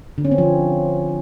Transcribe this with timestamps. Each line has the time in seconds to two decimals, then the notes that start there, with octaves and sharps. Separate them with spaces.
0.18 D3
0.25 C#4
0.31 C4
0.38 F3